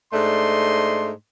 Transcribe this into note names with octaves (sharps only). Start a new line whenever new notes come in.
G#2 A3 D4 D#5 C6